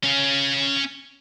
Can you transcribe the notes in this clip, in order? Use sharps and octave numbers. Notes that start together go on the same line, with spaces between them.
C#4 F5